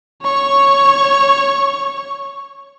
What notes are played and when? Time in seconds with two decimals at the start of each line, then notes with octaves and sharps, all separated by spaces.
0.22 C#5 C#6